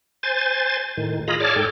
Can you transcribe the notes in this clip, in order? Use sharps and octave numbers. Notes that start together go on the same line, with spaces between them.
C5 G#5 A6
A2 D#3
F4 G#4 D#5 A#5 B5
G#4 C#5 D5 A5 D6 F6
G#2 A4 G5